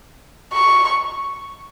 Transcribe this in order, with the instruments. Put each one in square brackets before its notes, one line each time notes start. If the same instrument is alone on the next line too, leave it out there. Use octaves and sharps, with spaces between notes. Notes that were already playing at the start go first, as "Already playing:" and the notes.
[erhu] C#6